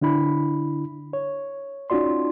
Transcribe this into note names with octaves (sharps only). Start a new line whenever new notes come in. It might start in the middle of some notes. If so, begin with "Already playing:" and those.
D3 D4 E4 B5
C#5
C#4 D#4 F4 F#4 D5 C6